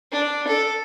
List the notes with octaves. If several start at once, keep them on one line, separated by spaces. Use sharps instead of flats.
D4
A4